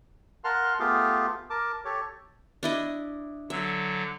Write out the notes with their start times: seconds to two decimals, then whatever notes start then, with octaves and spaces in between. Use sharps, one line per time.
0.44 A#4 F5 F#5 A5 C6 F6
0.79 A3 B3 F4 G4 G#4 F5
1.50 A#4 A5 D6
1.85 G4 A4 C#5
2.63 D4 E4 D#5
3.50 D3 F#3 E5